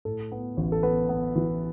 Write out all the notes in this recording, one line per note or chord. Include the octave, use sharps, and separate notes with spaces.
A2 A4
B3
A1
A4
B3 B4
B3
E3